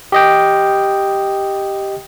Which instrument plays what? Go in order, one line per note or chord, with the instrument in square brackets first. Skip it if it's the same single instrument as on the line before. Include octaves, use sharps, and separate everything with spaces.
[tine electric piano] G4 D#5 G5